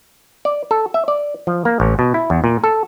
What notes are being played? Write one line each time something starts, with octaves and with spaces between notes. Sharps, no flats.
D5
A4
E5
D5
F3
A#3
A1
B2
E4
E2
A#2
A4